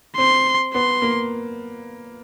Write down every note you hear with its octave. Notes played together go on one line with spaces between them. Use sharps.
C4 C6
B3 C6
A#3